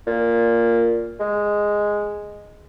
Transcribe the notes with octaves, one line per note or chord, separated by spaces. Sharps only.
A#2
G#3